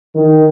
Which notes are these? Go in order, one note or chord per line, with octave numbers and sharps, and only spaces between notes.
D#3